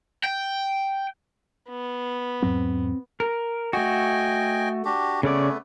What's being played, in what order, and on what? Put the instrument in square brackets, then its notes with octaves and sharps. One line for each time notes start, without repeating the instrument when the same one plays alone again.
[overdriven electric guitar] G5
[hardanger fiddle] B3
[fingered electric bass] E2 G#2 F#3 [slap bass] C4
[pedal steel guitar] A#4
[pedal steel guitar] A3 F#4 [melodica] D#5 G5 G#5
[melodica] D4 F#4 G4
[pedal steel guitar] C#3 C#4 D5 [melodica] A3 B3